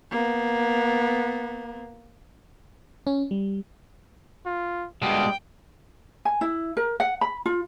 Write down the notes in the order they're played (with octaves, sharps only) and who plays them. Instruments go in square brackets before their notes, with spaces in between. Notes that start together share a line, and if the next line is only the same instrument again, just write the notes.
[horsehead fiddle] A#3 B3
[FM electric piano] C#4
G3
[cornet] F4
[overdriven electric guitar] G2 B2 [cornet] G3 [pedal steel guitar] G#3 [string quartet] G5
[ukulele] G#5
E4
A#4
F#5
B5
F4